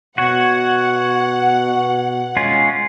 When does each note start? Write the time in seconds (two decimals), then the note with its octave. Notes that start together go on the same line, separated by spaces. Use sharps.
0.18 B2 F#4 C#5 F#5
2.37 G#3 C#4 F4